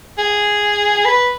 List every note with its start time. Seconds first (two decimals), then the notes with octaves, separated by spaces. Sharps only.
0.18 G#4
1.05 B4